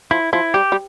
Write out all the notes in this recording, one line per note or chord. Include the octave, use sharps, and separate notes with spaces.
F3 E4
F3 E4
G3 G4
G3